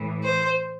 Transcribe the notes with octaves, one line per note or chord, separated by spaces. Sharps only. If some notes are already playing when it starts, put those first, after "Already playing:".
Already playing: A2 E3
C5